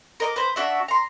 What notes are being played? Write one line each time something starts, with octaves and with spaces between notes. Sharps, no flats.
A#4 D#5 D6
B4 C5
D4 F#4 E5
A#5 C6